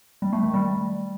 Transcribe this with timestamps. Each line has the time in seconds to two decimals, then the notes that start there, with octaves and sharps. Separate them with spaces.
0.22 G3
0.33 A3
0.43 D#3
0.54 G3